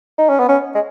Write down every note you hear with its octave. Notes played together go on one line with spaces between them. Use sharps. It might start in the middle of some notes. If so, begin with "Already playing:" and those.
D#4
C#4
B3
C#4
G#3